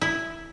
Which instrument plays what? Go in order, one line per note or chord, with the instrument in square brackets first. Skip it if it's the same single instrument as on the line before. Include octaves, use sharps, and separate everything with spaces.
[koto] E4